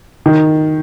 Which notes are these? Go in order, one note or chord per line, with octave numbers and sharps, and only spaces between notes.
D#3